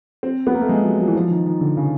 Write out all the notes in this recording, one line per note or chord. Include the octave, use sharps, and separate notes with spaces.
C4
B3
A#3
A3
G#3
F#3
F#3
E3
F3
D#3
D#3
D3
C#3